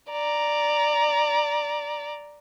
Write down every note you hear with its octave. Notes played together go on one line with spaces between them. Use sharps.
D5 A#5